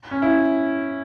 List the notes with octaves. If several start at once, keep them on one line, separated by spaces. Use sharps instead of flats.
C#4
E4